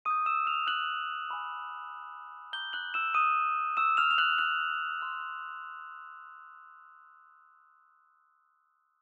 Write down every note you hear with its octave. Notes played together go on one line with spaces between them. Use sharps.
C#6 D#6 E6 G6 D#7
E6 E7
F6 F7
F#6 F#7
G#5 B5 D6
A#5 D6 F#6 G6 G7
F#6 F#7
E6 E7
D#6 D#7
C#6 E6 F#6 E7
F6 F7
F7
F#6 F#7
F#6 F#7
C6 F6